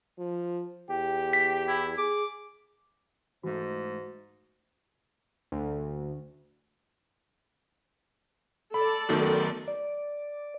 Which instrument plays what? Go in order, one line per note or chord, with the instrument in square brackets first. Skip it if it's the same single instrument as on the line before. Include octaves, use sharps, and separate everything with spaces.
[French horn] F3
[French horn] E2 [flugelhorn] G4
[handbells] B6
[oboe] E4
[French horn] G#4 [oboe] D6
[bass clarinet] G#2 [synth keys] E3 G#3 A3 [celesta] F#4
[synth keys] D2
[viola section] A4 D5 [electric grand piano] B5
[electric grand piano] F#2 D#3 D#4 [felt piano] F#3 A3 B3
[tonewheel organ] D5